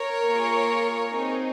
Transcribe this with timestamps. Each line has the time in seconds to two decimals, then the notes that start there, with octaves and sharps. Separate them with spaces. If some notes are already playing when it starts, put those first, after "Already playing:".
Already playing: A#4 C#5
0.28 A#3 F4 G#4
1.12 C4 D#4 G#4